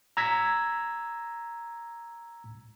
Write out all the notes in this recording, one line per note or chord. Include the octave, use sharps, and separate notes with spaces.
A#5 E6 G#6 A#6 B6